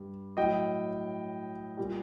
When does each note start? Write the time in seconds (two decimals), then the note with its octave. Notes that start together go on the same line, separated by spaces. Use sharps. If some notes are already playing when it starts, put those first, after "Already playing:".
Already playing: G2
0.37 A2 F#3 D#5 G5
1.77 A#2 G3